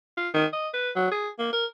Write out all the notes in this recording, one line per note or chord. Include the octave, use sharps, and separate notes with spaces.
F4
D#3
D#5
B4
F#3
G#4
A#3
A#4